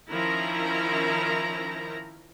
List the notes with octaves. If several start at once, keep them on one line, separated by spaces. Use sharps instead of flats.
D#3 F3 C#4 E4 A#4 A#5